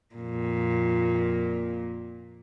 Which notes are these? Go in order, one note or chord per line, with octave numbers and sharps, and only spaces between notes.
F2 A#2